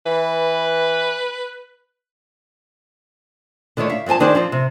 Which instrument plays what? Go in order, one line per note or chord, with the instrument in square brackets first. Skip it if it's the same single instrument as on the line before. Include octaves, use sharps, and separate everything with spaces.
[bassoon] E3 [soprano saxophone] B4
[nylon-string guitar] D3 D#3 A3 E4 C#5
E5 F5
G2 F3 C4 G#5 A5
D#3 D4 D#4 G#4 C5
F3 C4 F4
C3